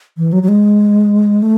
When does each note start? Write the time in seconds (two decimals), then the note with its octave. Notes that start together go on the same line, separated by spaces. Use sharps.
0.17 E3
0.33 F#3
0.43 F#3
0.48 G#3
1.42 A3